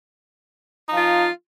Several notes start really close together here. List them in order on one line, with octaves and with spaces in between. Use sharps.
D#4 F3 F4